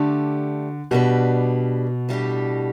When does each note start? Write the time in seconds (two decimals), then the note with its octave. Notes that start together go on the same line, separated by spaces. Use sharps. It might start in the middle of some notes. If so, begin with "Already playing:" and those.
Already playing: D3 A3 G4 D5
0.91 B2 G3 D4 G4 B4 D5
2.09 A2 G3 D4 G4